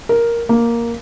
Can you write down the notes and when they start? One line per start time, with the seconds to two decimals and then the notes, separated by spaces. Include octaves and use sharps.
0.09 A#4
0.49 A#3